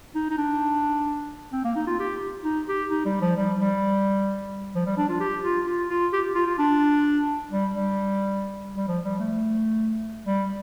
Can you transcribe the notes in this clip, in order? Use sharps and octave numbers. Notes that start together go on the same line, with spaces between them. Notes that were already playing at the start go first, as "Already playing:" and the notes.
D#4
D#4
D4
C4
A#3
D#4
F4
G4
D#4
G4
D#4
G3
F3
G3
G3
F3
G3
D4
F4
G4
F4
F4
F4
G4
F4
F4
D4
G3
G3
G3
F3
G3
A3
G3